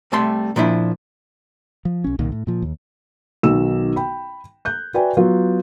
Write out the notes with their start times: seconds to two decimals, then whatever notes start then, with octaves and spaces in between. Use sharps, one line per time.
0.12 C2 C3 G3 A3 A5 C6
0.56 A#2 F3 D4 E4
1.85 F3
2.04 B1 C#4
2.19 C2 A#2 D#3
2.32 A2
2.47 A#2 F3
2.62 D#2
3.43 B1 D#3 E6 E7
3.96 G5 B5
4.65 F#6 G6
4.94 F#4 B4 D5 E5 G5 G#5
5.17 F#3 B3 F4